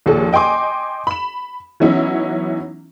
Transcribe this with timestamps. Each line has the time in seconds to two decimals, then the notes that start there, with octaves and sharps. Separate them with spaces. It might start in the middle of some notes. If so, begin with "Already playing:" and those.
0.06 A#1 D#2 F3 G#4 A4
0.33 D#5 G5 G#5 C6 D6
1.07 B5 E7
1.80 E3 F#3 B3 C#4 D#4 E4